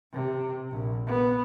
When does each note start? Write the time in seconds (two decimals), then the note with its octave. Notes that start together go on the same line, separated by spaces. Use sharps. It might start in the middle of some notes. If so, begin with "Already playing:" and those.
0.12 C3
0.71 A#1
1.07 B3